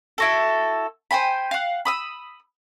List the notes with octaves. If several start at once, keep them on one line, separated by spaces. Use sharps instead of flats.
E4 F#4 A4
C5 G5 G#5 B5
F5 F#5
B5 D#6 E6